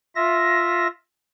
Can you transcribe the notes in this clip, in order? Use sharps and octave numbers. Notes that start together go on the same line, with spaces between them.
F4 E5 A#6